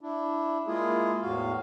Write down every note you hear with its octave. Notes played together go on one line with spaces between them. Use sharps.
D4 E4
G#3 A#3 E4 F4 G#4
E2 A2 F#4 F5